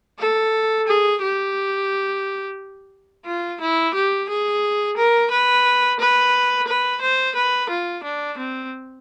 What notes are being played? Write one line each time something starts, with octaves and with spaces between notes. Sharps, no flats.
A4
G#4
G4
F4
E4
G4
G#4
A#4
B4
B4
B4
C5
B4
F4
D4
C4